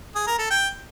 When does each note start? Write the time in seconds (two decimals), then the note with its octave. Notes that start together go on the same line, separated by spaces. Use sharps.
0.15 G#4
0.27 A#4
0.39 A4
0.50 G5